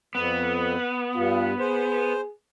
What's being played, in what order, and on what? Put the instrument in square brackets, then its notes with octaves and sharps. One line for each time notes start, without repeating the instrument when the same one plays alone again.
[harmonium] F2 [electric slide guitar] B3
[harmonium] G2 [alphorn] F4
[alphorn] G#4 [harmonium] C5